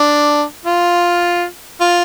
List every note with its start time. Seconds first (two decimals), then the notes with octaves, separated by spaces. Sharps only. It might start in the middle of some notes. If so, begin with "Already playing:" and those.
Already playing: D4
0.65 F4
1.80 F4